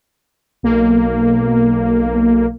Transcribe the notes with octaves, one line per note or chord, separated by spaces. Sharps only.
B1 A#3